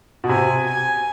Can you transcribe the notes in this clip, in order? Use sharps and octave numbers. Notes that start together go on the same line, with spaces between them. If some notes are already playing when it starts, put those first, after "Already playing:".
B2
C3 G#5
G#5